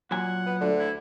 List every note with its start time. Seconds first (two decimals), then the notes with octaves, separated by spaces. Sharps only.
0.11 A#2 F#3 F#5 G#5
0.46 B3
0.61 D2 D3
0.79 E4